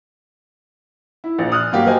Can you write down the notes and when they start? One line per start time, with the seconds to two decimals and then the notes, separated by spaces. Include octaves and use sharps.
1.24 E4
1.39 A#1
1.52 D#6 F6 F#6
1.72 G2 F#3 A#3 G4
1.86 A#4 C5 D#5 G#5